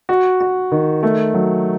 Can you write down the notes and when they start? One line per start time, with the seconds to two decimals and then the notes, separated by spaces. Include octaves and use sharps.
0.09 F#4
0.41 F#4
0.72 D#3
1.03 A3
1.34 F#3